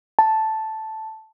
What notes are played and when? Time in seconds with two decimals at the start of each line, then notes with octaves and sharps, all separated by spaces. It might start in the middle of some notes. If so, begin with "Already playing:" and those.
0.19 A5